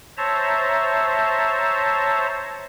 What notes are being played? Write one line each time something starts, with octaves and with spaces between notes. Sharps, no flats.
C5 C#5 E5 A5 A#5